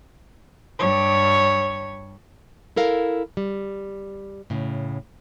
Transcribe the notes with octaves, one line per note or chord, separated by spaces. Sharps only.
G2 C#5
E4 A4 A#4 F5
G3
A2 C#3